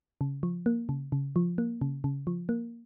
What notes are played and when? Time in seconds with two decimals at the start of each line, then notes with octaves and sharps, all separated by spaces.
0.21 C#3
0.43 F3
0.66 A#3
0.89 C#3
1.12 C#3
1.36 F3
1.58 A#3
1.81 C#3
2.04 C#3
2.27 F3
2.49 A#3